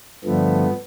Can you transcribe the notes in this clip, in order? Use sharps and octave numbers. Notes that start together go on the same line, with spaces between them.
G2 D3 F3 A3 B3